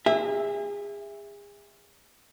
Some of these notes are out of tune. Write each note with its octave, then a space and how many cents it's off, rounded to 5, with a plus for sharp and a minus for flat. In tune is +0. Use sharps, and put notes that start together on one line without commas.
G#4 -35 E5 +0